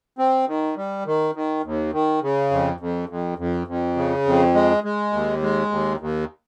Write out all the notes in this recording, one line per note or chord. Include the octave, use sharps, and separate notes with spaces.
C4
D#3
G3
D#3
D#3
D#2
D#3
C#3
F2
F2
F2
F2
F2
C#3
F2
G#3
G#3
D#2
G#3
D#2
D#2